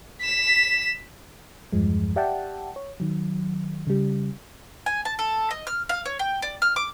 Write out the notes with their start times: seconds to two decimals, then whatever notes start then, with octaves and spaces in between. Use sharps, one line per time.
0.21 B6 E7
1.73 E2 G2 F3 G#3
2.16 G4 D5 E5 F#5 G5 A5
2.76 C#5
3.00 D#3 F#3
3.87 C#3 G3
4.86 G#5
5.05 A5
5.19 A4
5.51 D#5
5.67 F6
5.89 F5
6.05 C#5
6.19 G5
6.42 D5
6.62 F6
6.76 D6